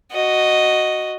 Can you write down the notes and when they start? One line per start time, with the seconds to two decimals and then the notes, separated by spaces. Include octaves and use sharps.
0.12 F#4 D#5